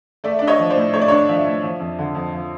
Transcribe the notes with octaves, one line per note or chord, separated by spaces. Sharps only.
A3 D5 E5
D4 D5
C#5 D#5
F3
C5 D5
A2
A3 C#5
D5
D4 C#5
F3 D5 E5
A2
F3
F2
D3
F2
F3